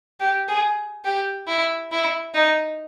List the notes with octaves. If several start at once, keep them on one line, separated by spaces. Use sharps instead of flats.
G4
G#4
G4
E4
E4
D#4